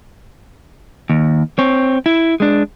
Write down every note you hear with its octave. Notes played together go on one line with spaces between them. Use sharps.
D#2
C4 C#5
E4
G#3 D4